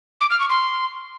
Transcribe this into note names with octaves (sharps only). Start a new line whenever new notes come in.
D6
F6
C#6
C6